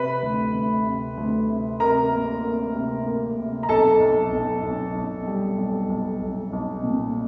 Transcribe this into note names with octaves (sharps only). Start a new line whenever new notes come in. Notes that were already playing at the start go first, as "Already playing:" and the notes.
Already playing: C3 B4 B5
D2
D2
C3
D2
C3
C3 A#4 A#5
A#3
A#3
C3
A#3
C3
A#5
B1 A4 A5
B1
B1
B1
B1
G3
B1
B1
B1
B1
A#2